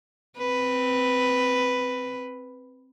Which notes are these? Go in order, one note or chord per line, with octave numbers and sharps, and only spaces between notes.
C4 B4